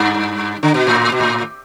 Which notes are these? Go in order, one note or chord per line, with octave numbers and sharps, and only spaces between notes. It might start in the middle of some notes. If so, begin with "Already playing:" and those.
Already playing: G2
D3
B2
A2
B2
A2